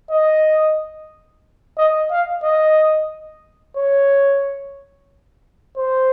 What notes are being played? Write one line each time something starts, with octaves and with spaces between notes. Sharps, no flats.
D#5
D#5
F5
D#5
C#5
C5